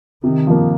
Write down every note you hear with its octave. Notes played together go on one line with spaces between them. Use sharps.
C3 D#3
F3 A#3